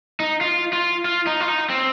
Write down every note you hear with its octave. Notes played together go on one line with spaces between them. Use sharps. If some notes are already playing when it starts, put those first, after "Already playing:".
D#4
F4
F4
F4
D#4
F4
D#4
C4